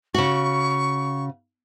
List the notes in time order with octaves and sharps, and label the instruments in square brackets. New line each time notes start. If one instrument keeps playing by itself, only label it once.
[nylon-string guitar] C#3 F#4 [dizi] C#6